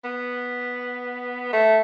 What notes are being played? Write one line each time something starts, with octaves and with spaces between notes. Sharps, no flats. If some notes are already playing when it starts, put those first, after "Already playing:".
B3
A3